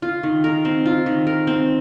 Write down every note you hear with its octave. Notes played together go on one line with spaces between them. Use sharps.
F4
D#3
A#4
C4
F4
D#3
A#4
C4